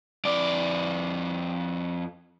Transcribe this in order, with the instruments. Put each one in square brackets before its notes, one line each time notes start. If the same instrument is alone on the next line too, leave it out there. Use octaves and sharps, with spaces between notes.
[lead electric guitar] F2 D5